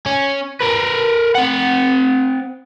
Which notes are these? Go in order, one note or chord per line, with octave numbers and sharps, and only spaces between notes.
C#4
A#4 B4
C4 F#5